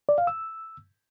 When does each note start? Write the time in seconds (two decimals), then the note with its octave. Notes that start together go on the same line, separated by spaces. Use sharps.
0.09 D5
0.18 F5
0.27 E6